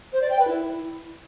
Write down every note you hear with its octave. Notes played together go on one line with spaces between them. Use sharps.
C5
D5
G5
B4
E4